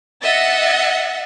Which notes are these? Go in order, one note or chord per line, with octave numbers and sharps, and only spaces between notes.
D#5 E5 F#5 A6